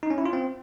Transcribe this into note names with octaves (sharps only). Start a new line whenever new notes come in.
D#4
C#4
E4
F4
C4